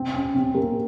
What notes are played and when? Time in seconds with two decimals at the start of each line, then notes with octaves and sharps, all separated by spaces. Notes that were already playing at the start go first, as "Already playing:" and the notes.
Already playing: C4
0.14 C#4
0.35 C4
0.55 A#3